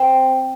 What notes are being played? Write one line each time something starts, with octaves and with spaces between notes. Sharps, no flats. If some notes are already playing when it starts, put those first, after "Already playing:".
Already playing: C4